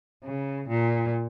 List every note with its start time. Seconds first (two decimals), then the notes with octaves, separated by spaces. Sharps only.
0.24 C#3
0.69 A#2